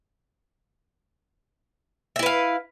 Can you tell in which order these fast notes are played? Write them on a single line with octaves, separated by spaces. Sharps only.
E5 E4 B4 F5